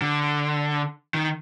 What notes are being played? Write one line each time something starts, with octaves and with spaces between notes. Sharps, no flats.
D3
D#3